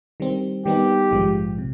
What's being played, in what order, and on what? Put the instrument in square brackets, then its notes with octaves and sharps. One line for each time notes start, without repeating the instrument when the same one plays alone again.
[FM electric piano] D#3 G3 C4
[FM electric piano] D#3 G3 B3 D#4 [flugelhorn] G4
[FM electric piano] A#1 G#2 F3 G#3
C3